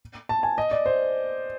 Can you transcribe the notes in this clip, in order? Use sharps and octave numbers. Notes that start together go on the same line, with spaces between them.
A5
G#5
D#5
D5
C5